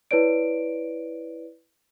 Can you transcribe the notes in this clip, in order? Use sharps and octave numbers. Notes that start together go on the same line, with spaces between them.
E4 B4 C#5 D5 D7